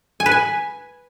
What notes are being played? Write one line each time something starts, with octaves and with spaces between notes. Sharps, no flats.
G#5
B4
G#5